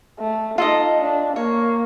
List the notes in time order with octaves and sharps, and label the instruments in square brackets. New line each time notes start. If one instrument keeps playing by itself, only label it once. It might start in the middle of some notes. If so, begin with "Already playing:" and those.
[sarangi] A3
[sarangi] D#4 [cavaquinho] F4 A4 D#5
[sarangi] D4
[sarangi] A#3 [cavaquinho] C#5